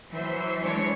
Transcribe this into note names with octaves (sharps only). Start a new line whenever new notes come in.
E3 F#3 C5 E5
E3 G#3 A3 D4 C#5